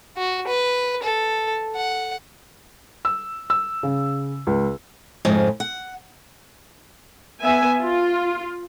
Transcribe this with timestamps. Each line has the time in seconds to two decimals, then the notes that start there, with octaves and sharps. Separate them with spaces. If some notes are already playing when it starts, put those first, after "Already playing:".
0.17 F#4
0.47 B4
1.03 A4
1.76 F#5
3.05 E6
3.50 E6
3.83 C#3
4.47 C#2
5.25 F2 G#2 C#3 F3
5.60 F#5
7.42 B3 E5 G#5
7.81 F4